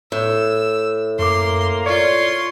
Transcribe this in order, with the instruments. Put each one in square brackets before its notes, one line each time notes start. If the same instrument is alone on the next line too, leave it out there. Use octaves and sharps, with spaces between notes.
[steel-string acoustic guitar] A2 [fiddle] E6
[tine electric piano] F#2 D6 [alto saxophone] A#3 [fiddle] C6
[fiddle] F4 C6 [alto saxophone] C#5 [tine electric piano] D5